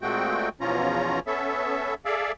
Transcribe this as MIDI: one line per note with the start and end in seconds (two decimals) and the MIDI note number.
0.02 0.49 46
0.02 0.49 56
0.02 0.49 57
0.02 0.49 60
0.02 0.49 66
0.02 0.49 79
0.61 1.20 40
0.61 1.20 47
0.61 1.20 53
0.61 1.20 61
0.61 1.20 65
0.61 1.20 82
1.27 1.94 59
1.27 1.94 61
1.27 1.94 69
1.27 1.94 76
2.05 2.32 68
2.05 2.32 69
2.05 2.32 74
2.05 2.32 76
2.05 2.32 77